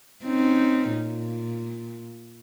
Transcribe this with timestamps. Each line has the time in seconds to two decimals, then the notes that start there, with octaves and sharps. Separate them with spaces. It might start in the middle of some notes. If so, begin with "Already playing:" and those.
0.25 C4 C#4 D#4
0.90 A#2